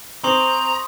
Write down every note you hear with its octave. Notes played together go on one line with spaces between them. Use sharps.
C4 A#5 C6 C#6 D#6